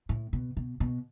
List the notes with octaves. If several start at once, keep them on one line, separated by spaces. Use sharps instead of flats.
A2
B2
B2
B2